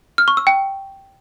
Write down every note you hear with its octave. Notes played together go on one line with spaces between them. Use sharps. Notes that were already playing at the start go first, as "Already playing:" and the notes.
F6
C#6
E6
G5